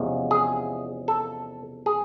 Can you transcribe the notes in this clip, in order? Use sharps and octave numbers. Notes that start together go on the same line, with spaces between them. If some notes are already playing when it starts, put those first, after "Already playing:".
Already playing: E2 C3 F3 G#3 C#4
G#4
A4
G#4